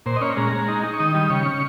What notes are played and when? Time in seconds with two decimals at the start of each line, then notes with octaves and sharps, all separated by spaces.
0.06 A#2 C5
0.16 D#5
0.21 C#4 C#5
0.37 G#3 A#5
0.52 G#3
0.68 D#4
0.83 D#4
0.93 C#6
1.00 D#3 D#6
1.14 G3 D#6
1.30 C#3 C#6
1.46 C#4